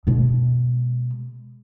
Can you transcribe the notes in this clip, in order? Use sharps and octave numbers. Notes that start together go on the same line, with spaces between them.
B2 G#3